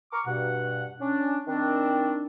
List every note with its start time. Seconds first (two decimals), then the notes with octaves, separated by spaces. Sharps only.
0.12 A#5 C#6 D6 F6
0.26 G2 B2 F#5
1.00 C#4 D4
1.47 D#3 C4 D4